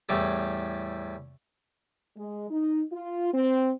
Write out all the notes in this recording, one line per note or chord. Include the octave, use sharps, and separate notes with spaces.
E2 A2 G3 A4
G#3
D#4
F4
C4